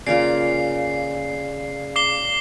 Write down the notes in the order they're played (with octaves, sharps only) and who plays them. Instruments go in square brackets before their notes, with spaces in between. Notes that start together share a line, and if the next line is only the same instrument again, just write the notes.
[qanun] C#3 A#3 F4 [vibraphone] D5 F5 [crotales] C7
[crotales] D6 C7 G7